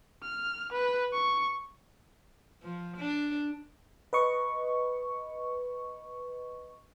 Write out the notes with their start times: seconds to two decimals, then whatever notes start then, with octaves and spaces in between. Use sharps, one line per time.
0.23 F6
0.72 B4
1.13 C#6
2.63 F3
2.98 D4
4.13 B4 D#5 C#6